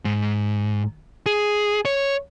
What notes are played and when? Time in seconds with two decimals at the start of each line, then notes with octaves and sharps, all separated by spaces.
0.05 G#2
1.26 G#4
1.85 C#5